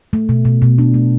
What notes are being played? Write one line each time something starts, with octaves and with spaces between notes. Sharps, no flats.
A3
B2
B2
B2
D4
A3